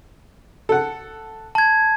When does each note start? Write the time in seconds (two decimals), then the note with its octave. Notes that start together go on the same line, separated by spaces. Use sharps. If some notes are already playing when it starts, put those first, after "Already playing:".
0.69 A4 F#5
1.55 A5 G#6